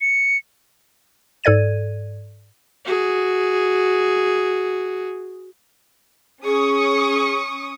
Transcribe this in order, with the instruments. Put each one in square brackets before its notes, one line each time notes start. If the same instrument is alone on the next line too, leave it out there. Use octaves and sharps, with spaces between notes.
[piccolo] C#7
[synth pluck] G#2 A4 D5 G#6 D#7
[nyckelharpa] F#4 G#4
[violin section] C#4 C#6 D#6 [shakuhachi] G#4